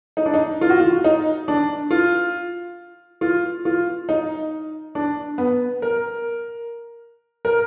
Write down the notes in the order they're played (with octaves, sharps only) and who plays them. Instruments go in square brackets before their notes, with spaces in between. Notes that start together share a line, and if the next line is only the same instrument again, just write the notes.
[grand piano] D#4
D4
D#4
F4
F#4
F4
D#4
D4
F4
F4
F4
D#4
D4
B3
A#4
A#4